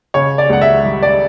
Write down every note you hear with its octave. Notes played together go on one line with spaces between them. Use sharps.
C#3 C#5
D5
C#2 F#5
E5
G3
D5